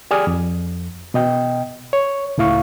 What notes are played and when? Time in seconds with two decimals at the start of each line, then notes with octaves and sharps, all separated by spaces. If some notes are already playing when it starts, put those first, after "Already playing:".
0.11 G4 G#4 D5 G#5 D#6 F6
0.27 F2
1.14 B2 D#5 G5
1.93 C#5
2.38 C#2 A2 E4 F5 C#6